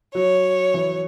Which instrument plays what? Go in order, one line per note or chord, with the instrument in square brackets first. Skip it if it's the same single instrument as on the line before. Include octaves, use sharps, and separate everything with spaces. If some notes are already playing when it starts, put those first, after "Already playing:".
[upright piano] F#3 [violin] C#5
[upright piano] E3